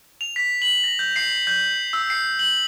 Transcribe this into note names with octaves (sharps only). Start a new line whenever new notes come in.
F7
B6
F#7
A#6
G6
C7
G6
E6
C7
F#7